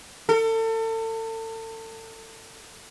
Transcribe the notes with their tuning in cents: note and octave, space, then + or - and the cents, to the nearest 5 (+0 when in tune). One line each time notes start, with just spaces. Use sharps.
A4 +35